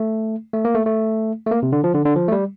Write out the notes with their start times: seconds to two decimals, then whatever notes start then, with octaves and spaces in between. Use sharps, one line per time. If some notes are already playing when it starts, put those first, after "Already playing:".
Already playing: A3
0.53 A3
0.65 A#3
0.75 A3
0.86 A3
1.46 A3
1.51 A#3
1.63 C3
1.72 D3
1.84 F3
1.95 D3
2.05 D3
2.16 F3
2.28 A3
2.32 G3